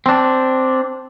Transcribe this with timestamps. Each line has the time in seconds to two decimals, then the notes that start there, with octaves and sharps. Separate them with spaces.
0.06 C4 D4